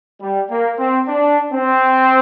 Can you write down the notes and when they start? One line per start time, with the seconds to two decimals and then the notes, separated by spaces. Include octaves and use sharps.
0.21 G3
0.50 A#3
0.78 C4
1.07 D4
1.52 C4